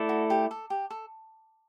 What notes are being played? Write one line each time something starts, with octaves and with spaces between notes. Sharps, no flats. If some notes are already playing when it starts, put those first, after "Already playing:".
Already playing: A3 E4 A4 D5
F#4
G4
A4
G4
A4